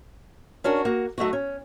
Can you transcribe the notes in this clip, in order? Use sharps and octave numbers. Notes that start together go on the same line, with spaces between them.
C#4 D4 F#4 A#4
A#3 F#4
F#3 A3 D#4 F#4
C#4